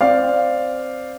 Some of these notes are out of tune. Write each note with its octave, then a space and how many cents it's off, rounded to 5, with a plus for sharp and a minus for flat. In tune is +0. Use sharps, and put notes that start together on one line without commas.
C4 +0 D5 +0 F5 +0